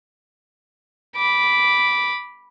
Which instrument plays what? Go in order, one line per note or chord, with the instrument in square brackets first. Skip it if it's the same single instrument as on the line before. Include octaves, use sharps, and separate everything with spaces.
[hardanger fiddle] B5 D6